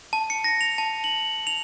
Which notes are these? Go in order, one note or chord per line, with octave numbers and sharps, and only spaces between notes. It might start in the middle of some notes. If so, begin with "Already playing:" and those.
A5
C#7
A#6
F7
A5
F#7
F7